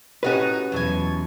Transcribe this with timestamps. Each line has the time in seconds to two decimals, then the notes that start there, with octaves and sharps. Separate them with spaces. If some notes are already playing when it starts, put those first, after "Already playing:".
0.23 A2 C#4 D#4 F#4 G4 B4
0.72 E2 B2 F#3 A4 G#5